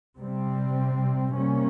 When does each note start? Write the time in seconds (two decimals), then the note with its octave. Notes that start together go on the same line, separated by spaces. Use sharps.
0.18 C3 G3 C4
1.33 C3 G3 A#3 C#4